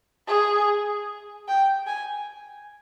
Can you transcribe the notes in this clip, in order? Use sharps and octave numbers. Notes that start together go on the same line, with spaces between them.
G#4
G5
G#5